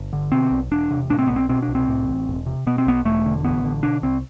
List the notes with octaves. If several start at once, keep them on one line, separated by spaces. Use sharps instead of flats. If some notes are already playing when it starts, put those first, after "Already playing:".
Already playing: G1
D3
B2 C4
B1
E1 D4
C3
A2 D4
C4
B1 B3
C4
B2 C4
D4
C2
C4
A2
A1
E1
C3
B2 B3
C4
B1 B3
E1 A3
D3
A1 B3
D3
B2 D4
C2 C4